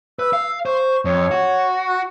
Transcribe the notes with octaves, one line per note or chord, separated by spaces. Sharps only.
B4 E6
F5
C5 C#6
F2 C#5
F#4
F#6